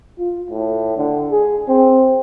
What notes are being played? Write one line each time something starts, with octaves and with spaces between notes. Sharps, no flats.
F4
A2
D3
G#4
C4